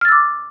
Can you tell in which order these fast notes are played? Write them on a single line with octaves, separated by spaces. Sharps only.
F6 A6 E6 D6